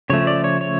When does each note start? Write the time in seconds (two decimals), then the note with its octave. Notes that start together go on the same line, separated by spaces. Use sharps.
0.10 C#3 F3 A3 C#5
0.27 D5
0.44 C#5
0.61 C#5